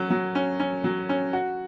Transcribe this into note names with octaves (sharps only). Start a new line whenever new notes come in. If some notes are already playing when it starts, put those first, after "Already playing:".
Already playing: F#3 C#4
F#3
C#4
C#4
F#3
C#4
F#4